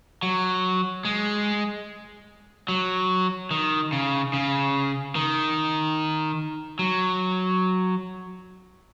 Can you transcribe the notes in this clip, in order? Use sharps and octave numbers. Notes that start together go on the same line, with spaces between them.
F#3
G#3
F#3
D#3
C#3
C#3
D#3
F#3